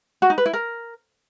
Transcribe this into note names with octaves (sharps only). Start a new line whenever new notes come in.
F#4
D#4
B4
E4
A#4